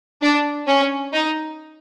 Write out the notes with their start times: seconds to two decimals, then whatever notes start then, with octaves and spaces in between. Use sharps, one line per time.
0.22 D4
0.67 C#4
1.13 D#4